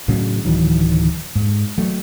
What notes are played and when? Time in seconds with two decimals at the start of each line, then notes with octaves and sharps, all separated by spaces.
0.08 A2 C#3 F#3
0.45 D1 D#3 E3 F#3
1.36 G#2
1.78 F#3 A3